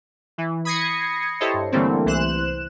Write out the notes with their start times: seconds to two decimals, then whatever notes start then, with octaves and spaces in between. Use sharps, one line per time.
0.38 E3
0.65 B5 D#6 G#6 A#6 C7 C#7
1.40 E4 G4 A4 C5 C#5 D#5
1.54 G2
1.72 D3 E3 G3 A3 A#3 C4
2.05 C2 E3 C5 F#6 E7